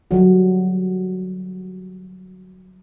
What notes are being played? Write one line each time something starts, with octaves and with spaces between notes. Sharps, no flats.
D3 F#3 G3 F#4